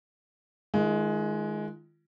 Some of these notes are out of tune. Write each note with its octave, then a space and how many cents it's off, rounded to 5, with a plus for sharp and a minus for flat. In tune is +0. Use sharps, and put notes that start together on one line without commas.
D#3 +0 G#3 +15 F4 -35